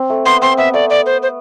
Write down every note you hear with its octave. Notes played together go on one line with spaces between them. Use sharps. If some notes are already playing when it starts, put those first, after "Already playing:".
Already playing: C4
A3
B3 C6
C4 C6
B3 E5
A3 D5
D5
C5
C5